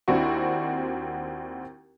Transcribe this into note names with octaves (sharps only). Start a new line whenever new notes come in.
D#2 C4 D4 E4 F#4 C#6